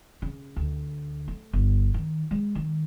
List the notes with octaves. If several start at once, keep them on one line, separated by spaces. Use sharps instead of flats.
C#3
D2
A3
G1
D#3
G#3
D#3